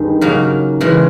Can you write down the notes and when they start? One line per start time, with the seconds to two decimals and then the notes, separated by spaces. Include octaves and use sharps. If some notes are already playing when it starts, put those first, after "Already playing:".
Already playing: G2 D#3 G#3
0.21 C#3 F#3 A#3 D#4
0.81 C#3 E3 G#3